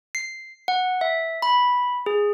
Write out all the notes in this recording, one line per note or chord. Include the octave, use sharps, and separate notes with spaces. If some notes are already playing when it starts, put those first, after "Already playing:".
C7
F#5
E5
B5
G#4